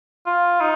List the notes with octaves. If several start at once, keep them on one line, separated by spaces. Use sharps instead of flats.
F4
D#4